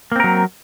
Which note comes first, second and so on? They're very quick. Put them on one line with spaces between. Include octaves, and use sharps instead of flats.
A#3 C4 A#4 F#3